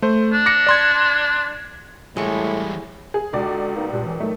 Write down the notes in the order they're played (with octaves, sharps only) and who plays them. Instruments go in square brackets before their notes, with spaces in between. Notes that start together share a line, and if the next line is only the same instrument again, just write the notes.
[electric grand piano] A3 C5
[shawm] D4
[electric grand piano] D6 A#6 C#7
D5 C6 G#6
[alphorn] A2 [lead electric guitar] E3 G3 [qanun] G#3 C#6
[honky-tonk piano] G#4
[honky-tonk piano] C#2 D5 [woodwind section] D3 F#4
[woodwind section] A#3 B3 D#4
G2 A#2
F#2 E3
[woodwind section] D#3 F#3 [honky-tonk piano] A3